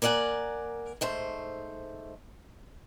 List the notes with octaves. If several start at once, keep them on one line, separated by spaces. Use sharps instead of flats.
A#3 A#4 D5 F#5 G#5
G#2 A3 C5